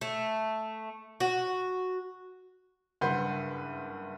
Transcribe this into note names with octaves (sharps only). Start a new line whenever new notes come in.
A3
F#4
F#1 G2 B4 F#5 C6 G6